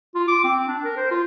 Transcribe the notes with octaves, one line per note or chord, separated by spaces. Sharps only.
F4
D6
C4
D4
A#4
C5
F4